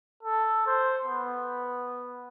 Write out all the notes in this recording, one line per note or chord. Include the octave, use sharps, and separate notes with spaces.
A4
C5
B3